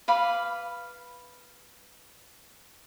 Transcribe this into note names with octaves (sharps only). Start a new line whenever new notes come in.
B4 F5 B5 D6